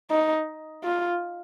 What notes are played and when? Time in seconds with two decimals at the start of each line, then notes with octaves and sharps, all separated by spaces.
0.10 D#4
0.84 F4